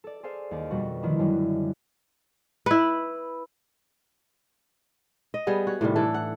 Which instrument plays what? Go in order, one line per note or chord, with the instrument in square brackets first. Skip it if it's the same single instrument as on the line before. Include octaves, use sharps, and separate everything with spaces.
[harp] A4 D5
G#4 A4 C5 F5
D#2 D5
F2 B2 G3 F#4
D3 D#3 F3 A3 D4 E4
F#2 D3 F#3 G3
[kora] E4 B4
D#5
G3 B3 G#4
F#4 C#5
A2 C3 D#3 G3
E3 D4 A4
F#5